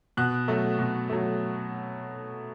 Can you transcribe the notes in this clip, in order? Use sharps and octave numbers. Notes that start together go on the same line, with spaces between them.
B2 F#6
F#3 A3
B2
F#3 A3